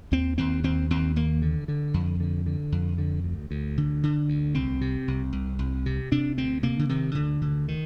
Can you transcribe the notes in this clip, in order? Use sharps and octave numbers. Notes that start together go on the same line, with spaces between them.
D#2 C4
D#2 C4
D#2 C4
D#2 C4
D#2 A#3
D3
D3
F2
D3
D3
F2
D3
D2
D2
D3
D3
D2
C2 C4
C3
C2
C2
C2
C3
C3 D4
D2 C4
C3 A#3
D3
C3 D#3
D2 D3
D2 D3
D#3